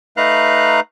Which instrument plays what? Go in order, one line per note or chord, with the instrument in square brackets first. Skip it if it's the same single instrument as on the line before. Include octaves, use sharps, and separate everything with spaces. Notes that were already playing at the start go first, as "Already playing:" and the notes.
[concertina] A3 D#4 B4 F5 A#5 F#6